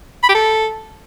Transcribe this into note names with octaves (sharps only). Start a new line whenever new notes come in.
B5
G4
A4